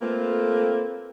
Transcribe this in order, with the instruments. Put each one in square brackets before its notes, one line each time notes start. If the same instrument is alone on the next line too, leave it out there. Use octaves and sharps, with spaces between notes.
[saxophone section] A3 A#3 C4 F4 A4 B4